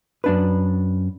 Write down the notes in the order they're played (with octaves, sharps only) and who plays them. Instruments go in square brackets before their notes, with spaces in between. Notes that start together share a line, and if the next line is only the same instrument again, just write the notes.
[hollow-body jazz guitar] F#2 D4 B4